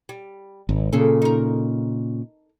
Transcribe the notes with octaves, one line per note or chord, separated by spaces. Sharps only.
G3
G#1
A#2 C#3 G#4 A4
D#4 A#4